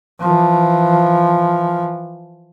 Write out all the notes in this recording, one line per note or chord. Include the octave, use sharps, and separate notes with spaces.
E3 F3